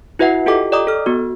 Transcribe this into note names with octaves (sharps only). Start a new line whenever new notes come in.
E4 F#4 B4 E5 F#5 C7
F4 G4 A4 D#5 G5 D6
D5 D#5 G5 A#5 D6 D#6
A4 F6
B3 F#4